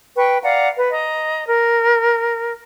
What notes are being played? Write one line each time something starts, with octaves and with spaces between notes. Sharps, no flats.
B4 G5 C#6
D5 F5 F#5 A#5
B4
D#5 A#5
A#4